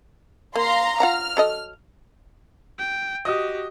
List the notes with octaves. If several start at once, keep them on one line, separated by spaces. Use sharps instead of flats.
A#3 F5 A#5 C6
F4 F#5 A#5 F6
F#3 A4 D#5
G5
F#4 G4 D#5 D#6